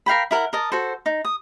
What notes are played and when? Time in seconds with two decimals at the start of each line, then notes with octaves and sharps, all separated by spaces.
0.06 A#4 F5 G5 B5
0.31 E4 A#4 F#5
0.53 A#4 D#5 A5
0.72 F#4 A4 C5
1.06 D#4
1.25 D#6